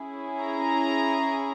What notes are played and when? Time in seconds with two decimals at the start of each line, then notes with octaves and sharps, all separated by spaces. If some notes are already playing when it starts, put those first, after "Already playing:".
Already playing: C#4 E4 G#4
0.41 A#5